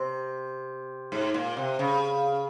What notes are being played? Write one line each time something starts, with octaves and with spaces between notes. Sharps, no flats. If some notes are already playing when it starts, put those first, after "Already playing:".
Already playing: C3
G#2
A#2
C3
C#3